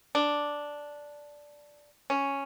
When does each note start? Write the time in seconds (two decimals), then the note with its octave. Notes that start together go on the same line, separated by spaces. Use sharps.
0.15 D4
2.10 C#4